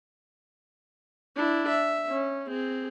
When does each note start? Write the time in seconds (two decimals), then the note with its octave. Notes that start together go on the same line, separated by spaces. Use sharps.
1.36 D4 E4
1.69 E5
2.10 C#4
2.47 C4 G#4